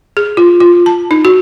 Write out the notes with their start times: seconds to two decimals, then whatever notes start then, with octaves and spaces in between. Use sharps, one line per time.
0.17 G#4
0.37 F4
0.61 F4
0.86 A5
1.11 D#4
1.25 F#4